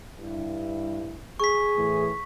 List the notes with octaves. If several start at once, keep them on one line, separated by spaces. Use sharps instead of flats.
G2 E4
G#4 C#6 B6
A2 E3